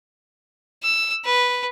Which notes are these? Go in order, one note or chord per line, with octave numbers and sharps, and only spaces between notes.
E6
B4